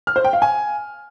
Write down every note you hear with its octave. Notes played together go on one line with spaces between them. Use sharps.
F6
C5
G5
F5
G#5